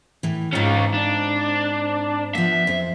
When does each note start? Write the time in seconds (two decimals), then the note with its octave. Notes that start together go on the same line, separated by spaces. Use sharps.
0.23 A2 E3
0.53 G#2 C4 C#4 F4
0.94 D4
2.35 F3 B3 E5
2.67 F2 C5